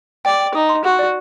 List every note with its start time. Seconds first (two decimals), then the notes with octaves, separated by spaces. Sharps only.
0.25 D5 G5
0.40 G5
0.55 D#4 D#6
0.69 C6
0.85 F#4 F#5
0.99 D5